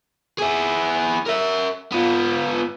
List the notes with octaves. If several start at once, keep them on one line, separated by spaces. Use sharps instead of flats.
E4 G#4
A#4 E5
B3 F4